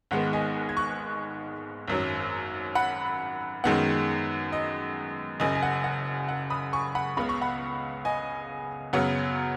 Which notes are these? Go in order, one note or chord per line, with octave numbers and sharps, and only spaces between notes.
G#1 G#2 D#3 G#3 B3 F#5
D#5 G#5
G#6
C#6 F#6
G#1 F#2 F#3
F#5 B5
F#2 D#3 G#3 B3 F#5
D#5
F#1 F#2 C#3 D#5 G#5
G#5
F#5
F#5
F#5
B5 D#6
G#5 C#6
F#5 B5
C#2 C#3 B3 B5
C#6
F#5 B5
D#5 G#5
F#2 C#3 F#3 B3 F#5